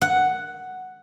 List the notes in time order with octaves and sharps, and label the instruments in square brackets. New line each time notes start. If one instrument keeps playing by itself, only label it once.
[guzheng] F#5